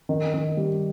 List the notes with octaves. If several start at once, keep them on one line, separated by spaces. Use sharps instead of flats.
D#3
D#3
G3